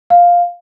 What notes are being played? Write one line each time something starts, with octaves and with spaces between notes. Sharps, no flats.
F5